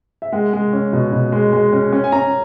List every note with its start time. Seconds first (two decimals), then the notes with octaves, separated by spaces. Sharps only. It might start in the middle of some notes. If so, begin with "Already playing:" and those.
0.22 E5
0.32 G#3 F#5
0.53 G#3
0.73 C#4
0.93 B2
1.13 B2
1.32 G#3
1.53 G#3
1.73 C#4
1.93 C#4
2.04 G#5
2.12 C#4 A#5